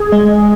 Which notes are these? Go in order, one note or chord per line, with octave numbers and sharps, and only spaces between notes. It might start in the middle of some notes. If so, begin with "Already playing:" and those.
Already playing: G#4
G#3